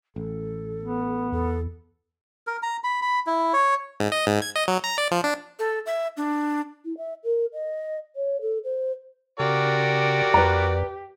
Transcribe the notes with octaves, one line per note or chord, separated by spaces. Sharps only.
A1 A4
B3
E2 A4
A#4
A#5
B5
B5
E4
C#5
G#2
D#5
G#2
G#6
D#5
F#3
A#5
D5
F3
D4
A4
E5
D4
E4
E5
A#4
D#5
C#5
A4
C5
C#3 F#4 G4 A#4 D5
F2 B4 A#5